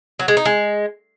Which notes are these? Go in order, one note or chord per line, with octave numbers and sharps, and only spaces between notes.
F#3
G#3
D#4
G#3